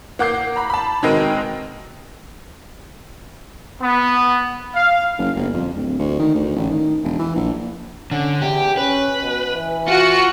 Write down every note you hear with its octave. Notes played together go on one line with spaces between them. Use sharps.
A#3 F#5 D6 G6 C7
A#5 B5
A5 B5
B2 D#3 G#3 C4 D#4 A#4
B3
F5
F#1
G1
F2
D1
D2
D#3
D2
A1
D#3
E1
E3
A#1
D3 C#4
E2 G4
C#4 B4
B2
E3
F4 F#4 C#7